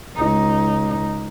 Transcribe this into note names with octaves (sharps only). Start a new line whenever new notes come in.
C#2 D#4